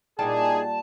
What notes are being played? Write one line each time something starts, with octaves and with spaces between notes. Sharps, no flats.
A#2 G3 D#4 E4 G#4 A5